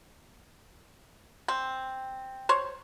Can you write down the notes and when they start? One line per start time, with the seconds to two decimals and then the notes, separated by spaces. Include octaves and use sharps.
1.48 C4
2.49 C5 C#5